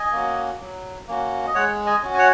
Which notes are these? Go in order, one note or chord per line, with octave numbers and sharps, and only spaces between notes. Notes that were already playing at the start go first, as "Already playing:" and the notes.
Already playing: D#5 G#5
A#3 C#4 F#4
F#3
A#3 C#4 F#4
D#5
G#3 C#5 F#5
D#5 G#5
C#4 F#4
G#5
C#5 F#5